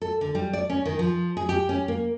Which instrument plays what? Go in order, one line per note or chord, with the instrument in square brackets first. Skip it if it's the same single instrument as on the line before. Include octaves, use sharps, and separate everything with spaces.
[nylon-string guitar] A4
D3
G3
D5
C#4
D#3
F3
G#4
G4
C#4
A#3